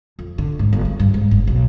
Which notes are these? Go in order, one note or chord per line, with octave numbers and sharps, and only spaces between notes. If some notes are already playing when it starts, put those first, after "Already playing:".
F2
D3
G#2
G1
G#3
G2
G#2
F#1
B1